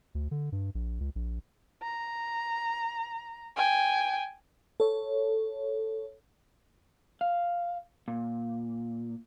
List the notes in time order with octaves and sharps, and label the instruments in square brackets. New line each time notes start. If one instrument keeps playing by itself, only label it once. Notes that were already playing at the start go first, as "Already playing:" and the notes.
[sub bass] D2
D3
G2
A#1
C#2
A#1
[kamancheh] A#5
G5 G#5
[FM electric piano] A4 C#5
[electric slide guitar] F5
A#2